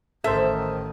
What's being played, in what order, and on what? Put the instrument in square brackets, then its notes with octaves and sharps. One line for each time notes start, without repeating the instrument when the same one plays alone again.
[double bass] A1 D#3 [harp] A4 [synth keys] A#4 C5 [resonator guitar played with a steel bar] E5